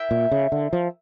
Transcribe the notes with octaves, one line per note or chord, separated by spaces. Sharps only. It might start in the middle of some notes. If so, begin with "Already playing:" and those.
Already playing: E4 A#4 E5 G5
A#2
C#3
D3
F3